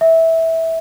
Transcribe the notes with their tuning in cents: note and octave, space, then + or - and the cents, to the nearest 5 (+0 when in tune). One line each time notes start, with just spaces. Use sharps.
E5 -15